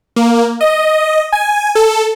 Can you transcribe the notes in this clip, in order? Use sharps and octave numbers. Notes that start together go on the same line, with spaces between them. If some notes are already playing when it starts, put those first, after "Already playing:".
A#3
D#5
G#5
A4